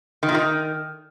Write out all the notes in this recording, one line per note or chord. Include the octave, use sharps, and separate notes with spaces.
D#3
A#2
D#3